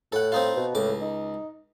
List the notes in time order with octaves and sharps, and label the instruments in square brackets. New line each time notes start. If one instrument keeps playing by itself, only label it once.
[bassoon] A2 [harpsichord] A4 F#5
[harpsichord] C4 D#4 F4
[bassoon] B2
[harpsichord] C#2 D6 [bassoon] A2
[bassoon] D#4